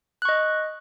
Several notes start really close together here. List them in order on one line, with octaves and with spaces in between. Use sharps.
F#6 C#6 D#5